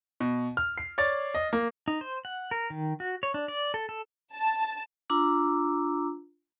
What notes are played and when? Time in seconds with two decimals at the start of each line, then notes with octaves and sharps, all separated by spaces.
0.20 B2
0.57 F6
0.78 C7
0.98 C#5 D5 A6
1.34 D#5
1.53 A#3
1.88 D#4
2.01 C5
2.25 F#5
2.51 A#4
2.70 D#3
3.00 F#4
3.23 C#5
3.34 D4
3.48 D5
3.74 A4
3.89 A4
4.34 A5
5.10 D4 F4 A#5 D6 E6